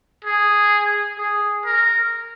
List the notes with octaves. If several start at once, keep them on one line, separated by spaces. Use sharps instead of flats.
G#4
G#4
A#4